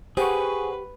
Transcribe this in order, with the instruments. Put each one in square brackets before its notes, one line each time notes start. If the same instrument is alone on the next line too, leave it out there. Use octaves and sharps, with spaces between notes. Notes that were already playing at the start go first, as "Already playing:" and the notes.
[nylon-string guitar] G4 [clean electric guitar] G#4 [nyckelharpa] B4 [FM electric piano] C5 F#5 C#6